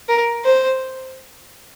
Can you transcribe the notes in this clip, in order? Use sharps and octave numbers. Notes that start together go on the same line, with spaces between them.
A#4
C5